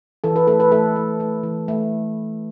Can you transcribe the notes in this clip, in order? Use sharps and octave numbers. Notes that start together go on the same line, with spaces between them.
E3 A4
B4
A3 A4
B4
A3 A4
A3
A3
E3
A3